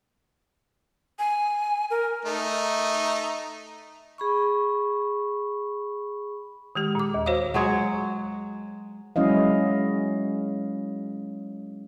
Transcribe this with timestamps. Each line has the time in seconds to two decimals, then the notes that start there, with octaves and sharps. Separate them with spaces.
1.19 G#5
1.91 A#4
2.25 A3 D#4
4.18 G#4 B5 C#6
6.75 D#3 G#3 G4
6.95 A#2 D6
7.14 D#2
7.26 F#4 C5 C#5 F5 D#6
7.54 F#3 G#3 C#5
9.16 F#3 G#3 C#4 E4 D#5 F5